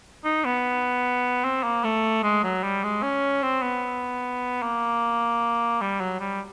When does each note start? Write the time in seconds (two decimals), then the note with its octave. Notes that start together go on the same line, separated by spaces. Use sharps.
0.25 D#4
0.45 B3
1.44 C4
1.63 A#3
1.84 A3
2.23 G#3
2.44 F#3
2.63 G3
2.84 G#3
3.02 C#4
3.43 C4
3.62 B3
4.62 A#3
5.81 G3
6.00 F#3
6.20 G3